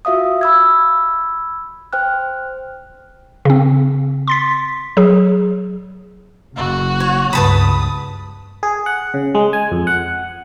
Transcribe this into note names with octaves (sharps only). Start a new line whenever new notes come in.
F4 F#4 E5 F5 D#6
B5 E6 G#6
C5 G5 F6 F#6
C#3 C4
C6 A6 B6
F#3 G#4
F#1 F#4
C#5
C#2 G2 B4 A5 B5 D#6
G#4
F#5
C#3
G#3
G#5
F2
F#5